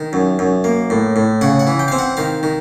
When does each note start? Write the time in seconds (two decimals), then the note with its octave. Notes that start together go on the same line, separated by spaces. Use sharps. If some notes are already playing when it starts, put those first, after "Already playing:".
Already playing: D#3
0.13 F#2
0.39 F#2
0.64 A#3
0.90 A2
1.16 A2
1.41 C#3 F#5
1.59 F#5
1.67 E3
1.79 G5
1.88 C4 F5
1.98 F#5
2.17 D#3 F5
2.43 D#3